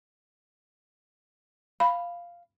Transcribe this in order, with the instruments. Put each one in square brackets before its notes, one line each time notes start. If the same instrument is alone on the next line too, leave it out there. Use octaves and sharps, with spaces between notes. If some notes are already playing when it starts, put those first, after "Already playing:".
[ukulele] F5 [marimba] B5